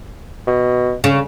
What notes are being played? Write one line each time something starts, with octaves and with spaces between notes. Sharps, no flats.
B2
C#3